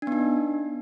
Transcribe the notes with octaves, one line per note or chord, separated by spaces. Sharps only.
B3 D4 D#4